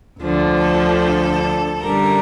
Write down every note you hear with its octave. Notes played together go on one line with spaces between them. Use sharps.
D2 D3 F3
A4
F#2 D3 G3 A#4